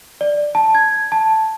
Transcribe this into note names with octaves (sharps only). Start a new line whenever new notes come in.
D5
A5
G#6
A5